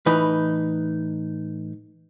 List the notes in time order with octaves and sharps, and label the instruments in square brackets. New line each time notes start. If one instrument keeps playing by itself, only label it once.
[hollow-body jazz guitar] A2 E3 D#4 B4